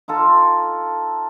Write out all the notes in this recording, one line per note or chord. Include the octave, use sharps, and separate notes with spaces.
D#4 F4 A4